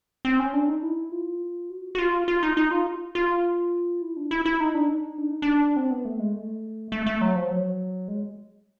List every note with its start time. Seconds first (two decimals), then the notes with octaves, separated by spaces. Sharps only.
0.25 C4
0.40 C#4
0.54 D4
0.68 D#4
0.83 E4
1.12 F4
1.70 F#4
1.95 F#4
1.98 F4
2.28 F4
2.43 D#4
2.57 D#4
2.71 F4
3.15 F4
4.02 E4
4.17 D4
4.31 E4
4.46 E4
4.60 D#4
4.75 D4
4.89 D#4
5.18 D4
5.30 D#4
5.42 D4
5.76 C4
5.91 B3
6.05 A3
6.19 G#3
6.34 A3
6.92 A3
7.06 A3
7.21 F#3
7.36 F3
7.50 F#3
8.08 G#3